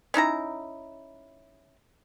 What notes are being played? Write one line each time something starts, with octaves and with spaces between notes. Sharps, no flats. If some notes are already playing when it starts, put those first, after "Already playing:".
C#4 D#4 E4 A#5